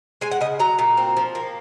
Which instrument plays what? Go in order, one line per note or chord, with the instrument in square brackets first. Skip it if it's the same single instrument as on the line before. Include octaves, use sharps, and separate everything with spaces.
[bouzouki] G#3 G#5
F#5
C#3 D#5
F#3 A#5
A#2
C4
F3
A#3